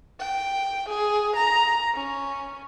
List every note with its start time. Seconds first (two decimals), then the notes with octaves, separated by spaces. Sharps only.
0.20 G5
0.89 G#4
1.36 A#5
1.95 C#4